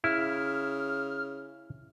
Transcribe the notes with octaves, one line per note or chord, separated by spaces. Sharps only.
C#3 E4 F6